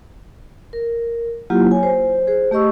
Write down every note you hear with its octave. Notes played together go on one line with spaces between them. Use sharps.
A#4
F#3 A#3 E4 F4 G4
C#5 G#5
C5
G#4 C5
A3 G4 D#5 C#6 E6